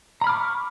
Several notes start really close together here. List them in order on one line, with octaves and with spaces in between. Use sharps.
A#5 B5 F6 D6 C#6